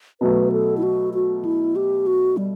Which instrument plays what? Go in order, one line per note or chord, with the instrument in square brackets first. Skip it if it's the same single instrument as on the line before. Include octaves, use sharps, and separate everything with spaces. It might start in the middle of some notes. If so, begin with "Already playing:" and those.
[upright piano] B2 F#3 A3 [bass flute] B4
[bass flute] A4
E4
F#4
F#4
E4
G4
F#4
G3